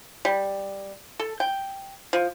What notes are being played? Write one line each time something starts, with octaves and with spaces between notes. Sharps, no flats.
G3
A4
G5
F3